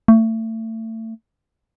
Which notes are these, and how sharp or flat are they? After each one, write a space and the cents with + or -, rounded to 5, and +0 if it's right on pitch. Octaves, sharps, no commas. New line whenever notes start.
A3 +30